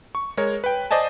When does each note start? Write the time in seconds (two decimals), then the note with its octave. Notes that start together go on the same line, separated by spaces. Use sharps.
0.15 C#6
0.37 G#3 A#4 C#5
0.64 B4 G5
0.91 C5 D5 D#5 G#5 A5